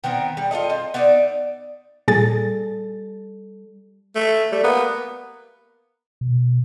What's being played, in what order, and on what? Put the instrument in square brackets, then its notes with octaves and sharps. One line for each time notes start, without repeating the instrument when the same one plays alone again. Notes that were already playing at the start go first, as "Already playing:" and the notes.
[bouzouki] D#3 B3 C4 A#4
G3
F4 G#4 A4 D#5
C4
B3 D#4 E4 D5
[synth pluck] A#2 G#4 A6 [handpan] G3 A4
[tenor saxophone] A3
[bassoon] G3 [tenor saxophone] A3
[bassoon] A#3 [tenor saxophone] B3
[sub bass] B2